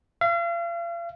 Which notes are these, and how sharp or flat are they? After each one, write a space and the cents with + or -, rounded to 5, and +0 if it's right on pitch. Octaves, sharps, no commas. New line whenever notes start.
F5 -40